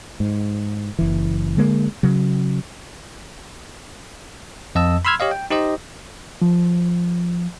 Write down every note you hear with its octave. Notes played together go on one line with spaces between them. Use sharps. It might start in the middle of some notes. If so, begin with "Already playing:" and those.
G#2
F#1 E3
D3 G#3 A#3
C#3 F#3
F2 D#5 A5 E6
B5 C6 E6 F6 G#6
G4 C#5 D#5 F5
G5
D#4 G4 C5 D#5
F3